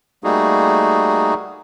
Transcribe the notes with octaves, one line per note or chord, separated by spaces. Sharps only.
G3 A3 A#3 D#4 F#4 G#4